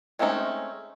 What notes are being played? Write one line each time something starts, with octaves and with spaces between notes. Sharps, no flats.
G#3 A3 C4 C#4 D#4